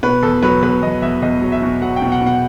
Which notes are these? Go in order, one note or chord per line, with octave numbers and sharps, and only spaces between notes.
B2 B4
E2 A4
F#3 B4
E2 B4
E2 D#5
E2 E5
E2 D#5
F#3
E5
B2
F#3 F#5
G5
B2
F#5
B2
F#5